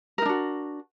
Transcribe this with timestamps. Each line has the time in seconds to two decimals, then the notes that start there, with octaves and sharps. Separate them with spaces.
0.18 A#4
0.22 D#4
0.25 D4
0.29 F#4